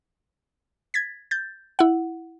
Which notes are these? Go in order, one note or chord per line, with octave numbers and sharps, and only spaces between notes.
G#6 A6 B6
G6 A6
E4 F#5